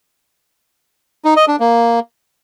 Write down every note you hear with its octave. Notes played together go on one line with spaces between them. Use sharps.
D#4
D#5
D4
A#3